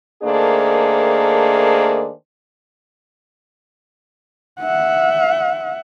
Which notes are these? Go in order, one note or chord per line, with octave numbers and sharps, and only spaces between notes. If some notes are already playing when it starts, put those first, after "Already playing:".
D#3 A3 A#3 D4 G#4 C5
E5 F#5